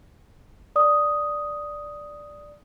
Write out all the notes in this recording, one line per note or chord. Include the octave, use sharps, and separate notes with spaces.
D5 D#6